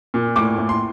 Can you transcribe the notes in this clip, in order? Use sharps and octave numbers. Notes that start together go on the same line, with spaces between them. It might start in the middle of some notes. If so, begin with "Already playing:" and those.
A#2
A2 D6
A2
C6